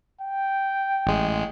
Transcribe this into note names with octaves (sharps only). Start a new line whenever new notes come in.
G5
A1 G#3